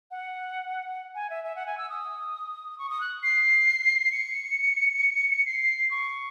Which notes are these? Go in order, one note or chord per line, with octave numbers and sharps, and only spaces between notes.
F#5
G#5
E5
E5
F#5
G#5
E6
D#6
C#6
D#6
F#6
C7
C#7
C7
C#6